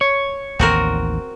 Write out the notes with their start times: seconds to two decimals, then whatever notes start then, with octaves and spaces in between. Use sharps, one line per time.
0.01 C#5
0.59 A1 D#2 D#3 C4 F#4 A#4